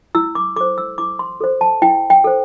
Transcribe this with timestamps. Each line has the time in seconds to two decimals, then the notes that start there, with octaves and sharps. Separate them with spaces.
0.15 E4 E6
0.35 D6
0.56 A4 C5 D6
0.78 E6
0.98 E4 D6
1.19 C6
1.41 A4 C5
1.61 A5
1.82 E4 G5
2.10 G5
2.24 A4 C5